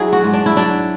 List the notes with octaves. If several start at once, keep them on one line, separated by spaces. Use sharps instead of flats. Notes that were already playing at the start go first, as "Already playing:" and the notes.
Already playing: F#3 D4 E4 G#4
F#4
G#2
D4
E4
F#3 D4